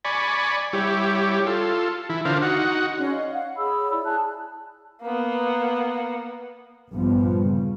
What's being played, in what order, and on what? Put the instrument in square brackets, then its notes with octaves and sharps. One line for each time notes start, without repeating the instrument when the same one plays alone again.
[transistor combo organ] D5 G#5 B5 C#6
G3 E4 G4 C#5
F4 A4
E3 E4
D3 D4 F4 A#4 C5 F5
D#4 F#4 F#5
[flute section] C#4 G#4 D5 C6
D#5 F5
F5 F#5
G#4 C#5 B5 E6
E4 D5 B5
G#4 A5 F#6
[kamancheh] A#3 B3
[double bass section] A#1 G2 F3 G3 B3
C#3